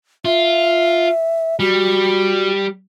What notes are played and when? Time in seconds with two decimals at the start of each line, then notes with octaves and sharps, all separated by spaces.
0.25 F4 E5
1.60 G3 F#4